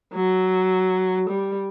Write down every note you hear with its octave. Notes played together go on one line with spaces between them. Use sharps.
F#3
G3